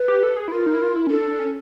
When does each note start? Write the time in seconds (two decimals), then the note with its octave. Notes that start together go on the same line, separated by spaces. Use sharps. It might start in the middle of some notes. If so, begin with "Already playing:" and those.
Already playing: B4
0.08 G4
0.23 A4
0.36 G#4
0.48 E4
0.52 F4 A#4
0.66 D#4
0.74 E4
0.82 F4
0.96 E4
1.07 C#4
1.10 D4 A4
1.39 C#4